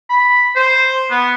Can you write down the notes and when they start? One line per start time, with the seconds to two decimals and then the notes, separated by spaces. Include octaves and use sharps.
0.09 B5
0.56 C5
1.10 B3